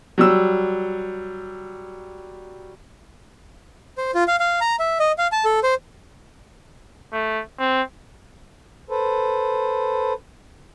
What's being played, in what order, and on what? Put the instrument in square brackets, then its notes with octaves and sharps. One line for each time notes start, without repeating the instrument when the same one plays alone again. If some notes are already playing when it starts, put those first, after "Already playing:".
[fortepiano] F#3 G3 E6
[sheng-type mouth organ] C5
F4
F5
F5
A#5
E5
D#5
F5
A5
A4
C5
[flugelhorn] A3
C4
[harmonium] A4 B4 C5